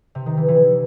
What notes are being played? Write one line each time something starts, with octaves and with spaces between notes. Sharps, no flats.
C3
D#3
E3
E3